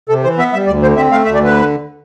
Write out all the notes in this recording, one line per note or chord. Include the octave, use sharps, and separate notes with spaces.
C3 A4
E3 C5
B3 E5
G3 E5
D2 D5
D3 C5
C4 E5
A3 F5
D2 E5
D5
D3 B4